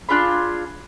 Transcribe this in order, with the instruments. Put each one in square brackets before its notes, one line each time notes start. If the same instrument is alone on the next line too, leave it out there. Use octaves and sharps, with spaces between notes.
[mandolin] D4 F4 G#4 B5